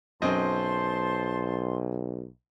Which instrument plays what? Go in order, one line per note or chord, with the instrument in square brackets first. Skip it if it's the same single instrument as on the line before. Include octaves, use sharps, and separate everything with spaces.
[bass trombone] B1 [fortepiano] F#2 C4 D#5 [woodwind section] C5 A5 C6